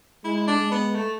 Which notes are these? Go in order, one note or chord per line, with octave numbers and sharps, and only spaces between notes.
G#3 E4
E4
D4
G#3
B3
A3